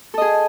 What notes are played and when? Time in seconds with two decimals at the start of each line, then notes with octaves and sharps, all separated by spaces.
0.14 A4
0.18 D#5
0.21 G#4